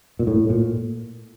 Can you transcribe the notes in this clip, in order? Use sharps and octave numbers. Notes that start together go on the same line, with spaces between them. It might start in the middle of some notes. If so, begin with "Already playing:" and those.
A#2
A2
A#2